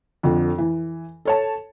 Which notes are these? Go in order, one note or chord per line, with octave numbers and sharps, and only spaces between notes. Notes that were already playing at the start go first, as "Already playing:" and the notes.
F2 D3 F3
E3
A4 C#5 A5